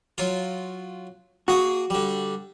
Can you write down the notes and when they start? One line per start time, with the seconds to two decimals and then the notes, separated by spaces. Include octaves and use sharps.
0.18 F#3 F4
1.48 A#3 F#4 G#4
1.90 D3 G3